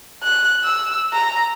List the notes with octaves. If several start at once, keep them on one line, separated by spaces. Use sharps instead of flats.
F#6
E6
A#5